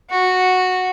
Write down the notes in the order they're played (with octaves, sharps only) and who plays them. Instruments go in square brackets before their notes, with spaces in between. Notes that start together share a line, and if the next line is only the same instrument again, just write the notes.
[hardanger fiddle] F#4